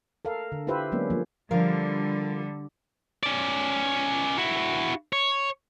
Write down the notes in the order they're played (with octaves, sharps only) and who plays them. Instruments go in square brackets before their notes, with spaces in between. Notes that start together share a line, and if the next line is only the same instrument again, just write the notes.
[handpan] A4 A#4 F5
D3
E4 F4 G4 B4 C5 E5
F#3 G#3 A#3 B3 C#4 D4
F3 A#3
[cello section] D3 G3 [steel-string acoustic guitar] F3 A#4 F5
[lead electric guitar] C#4 D5
E4 F#4
C#5